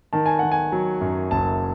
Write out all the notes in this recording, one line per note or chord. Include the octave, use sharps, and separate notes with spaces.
D#3 A5
G#5
D#3 F#5
G#5
F#3
F#2
F#1 A5